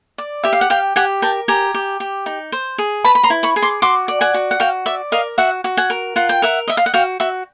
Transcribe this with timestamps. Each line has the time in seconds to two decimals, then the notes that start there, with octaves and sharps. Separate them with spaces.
0.18 D5
0.44 G4 E5
0.53 F5
0.61 F#5
0.70 G4 F5 G5
0.96 G4 F#5 G#5
1.22 A#4 G5 A5
1.48 G4 G#5 A#5
1.74 G4
2.00 G4
2.26 D#4
2.52 C5
2.78 G#4
3.04 B4 A5 B5
3.15 B5
3.23 A#5 C6
3.30 E4
3.43 B5 C#6
3.56 G#4
3.62 C6 D6
3.82 F#4 C6 D6
4.08 D5
4.21 F#5 G#5
4.34 F#4
4.51 F#5
4.60 F#4 F5 G5
4.86 D5 E5
5.12 A#4 D#5 F5
5.38 F#4 E5 F#5
5.64 F#4
5.77 F#5 G#5
5.90 A#4
6.16 F4 F#5
6.29 G5
6.42 A#4 E5 F#5
6.68 D#5 E5
6.77 F5
6.86 F#5
6.94 F#4 F5 G5
7.20 F#4 E5